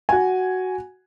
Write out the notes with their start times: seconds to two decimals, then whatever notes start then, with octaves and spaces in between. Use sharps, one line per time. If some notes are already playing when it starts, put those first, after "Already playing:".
0.09 F#4 G#5